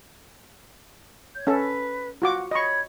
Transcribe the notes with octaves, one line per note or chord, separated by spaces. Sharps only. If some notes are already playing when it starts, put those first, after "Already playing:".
C#5 G6
C#4 A4 B4
F4 F#4 F#5 D6
C#5 D#5 B5 C#6